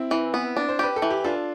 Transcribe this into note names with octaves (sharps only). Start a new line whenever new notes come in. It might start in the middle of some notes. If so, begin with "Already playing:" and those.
Already playing: C4 E4
E3
B3
D4
C5
G4 B4
A4
E3
G4
D4 F4 A4